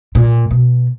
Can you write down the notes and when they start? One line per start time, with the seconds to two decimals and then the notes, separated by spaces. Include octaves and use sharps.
0.15 A#2
0.51 B2